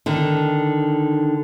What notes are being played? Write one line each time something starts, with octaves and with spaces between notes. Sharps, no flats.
D3 D#3